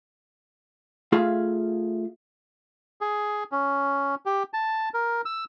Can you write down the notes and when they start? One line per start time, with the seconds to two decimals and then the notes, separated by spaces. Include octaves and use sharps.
1.12 A3 F4 G#4 E5 F5
3.01 G#4
3.52 C#4
4.26 G4
4.53 A5
4.94 A#4
5.25 E6